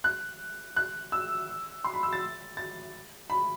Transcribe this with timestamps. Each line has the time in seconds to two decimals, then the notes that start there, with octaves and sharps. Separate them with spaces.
0.04 F#6
0.76 F#6
1.12 E6
1.84 C6
1.94 B5
2.03 E6
2.13 A6
2.57 A6
3.30 B5